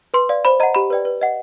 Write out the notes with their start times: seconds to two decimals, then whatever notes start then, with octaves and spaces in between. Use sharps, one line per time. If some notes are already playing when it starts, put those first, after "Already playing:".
0.14 B4 C6
0.29 D5 F5
0.45 C5 B5
0.60 D#5 F#5 A#5
0.75 G4 B5
0.90 B4 D5 G5
1.05 B4
1.21 D#5 F#5